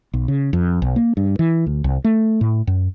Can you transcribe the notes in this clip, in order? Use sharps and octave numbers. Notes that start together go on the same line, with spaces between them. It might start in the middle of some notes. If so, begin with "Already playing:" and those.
B1
C#3
F2
B1
A#3
G2
E3
D2
C2
A3
A2
F#2